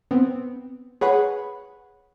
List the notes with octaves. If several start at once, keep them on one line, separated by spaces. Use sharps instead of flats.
B3 C4
G#4 B4 C#5 F#5 B5